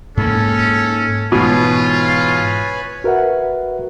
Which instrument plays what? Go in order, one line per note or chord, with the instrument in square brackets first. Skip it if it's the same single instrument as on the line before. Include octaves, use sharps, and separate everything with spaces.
[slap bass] G#2 A#3 [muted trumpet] C#4 [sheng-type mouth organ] A4
[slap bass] G#2 E3 [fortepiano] B2 [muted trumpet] F4 [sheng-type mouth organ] B4 C#5 G#5
[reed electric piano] F#4 A#4 B4 E5 F#5